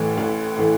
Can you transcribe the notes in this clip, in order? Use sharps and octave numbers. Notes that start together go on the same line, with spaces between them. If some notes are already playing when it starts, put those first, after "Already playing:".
Already playing: A1 A2 E3 A3
A1
A2 E3 A3